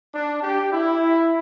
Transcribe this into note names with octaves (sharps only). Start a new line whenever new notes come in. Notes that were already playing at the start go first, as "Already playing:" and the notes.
D4
G4
E4